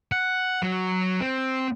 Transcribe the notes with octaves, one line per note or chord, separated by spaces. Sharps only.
F#5
F#3
C4